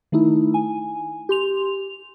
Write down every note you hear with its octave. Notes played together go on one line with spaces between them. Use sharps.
D#3 A3 D#4 E4
G#5
G4 C6 F7